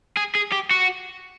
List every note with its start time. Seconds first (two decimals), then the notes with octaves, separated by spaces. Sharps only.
0.17 G#4
0.35 G#4
0.52 G4
0.71 F#4